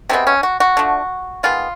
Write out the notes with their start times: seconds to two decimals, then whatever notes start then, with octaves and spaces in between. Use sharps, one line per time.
0.09 C3 E3 G#3 B3 C4
0.27 C#4
0.43 F#4
0.60 F#4
0.77 D3 F3 A3
1.43 D#3 G#3 B3 F4